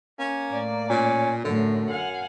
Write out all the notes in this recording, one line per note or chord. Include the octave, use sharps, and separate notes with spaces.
A#3 C#4
A2 D5
A#2 C#4
F#2 A2 D3
F5 F#5 G#5